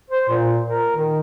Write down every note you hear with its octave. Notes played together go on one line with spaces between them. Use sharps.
C5
A#2
A#4
D#3